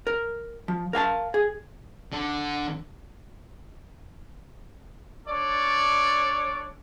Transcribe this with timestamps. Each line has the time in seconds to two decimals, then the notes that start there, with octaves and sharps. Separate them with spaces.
0.07 A#4
0.68 F3
0.93 A#4 F5 G#5 A5
1.34 G#4
2.12 D3
5.27 D4 A4 C#5 D5